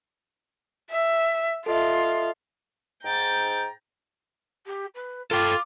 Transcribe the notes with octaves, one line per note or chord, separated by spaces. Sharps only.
E5
F4 A4 D#5 E5
G#2 G5 A#5 G6 A6
G4
B4
F4 A4 G5 D6